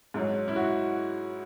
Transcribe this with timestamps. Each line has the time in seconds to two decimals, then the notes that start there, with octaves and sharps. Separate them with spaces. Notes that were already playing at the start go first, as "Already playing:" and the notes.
0.14 G#2 F#3
0.48 E4
0.56 F#4